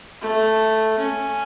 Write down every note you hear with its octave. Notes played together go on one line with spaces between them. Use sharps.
A3
C#4